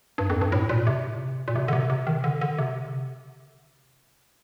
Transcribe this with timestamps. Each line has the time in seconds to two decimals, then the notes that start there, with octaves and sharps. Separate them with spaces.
0.18 G2
0.30 F2
0.41 G2
0.52 A2
0.69 A#2
0.87 C3
1.48 A#2
1.56 C3
1.68 D3
1.73 C3
1.90 C3
2.07 D#3
2.24 D3
2.41 D3
2.58 C3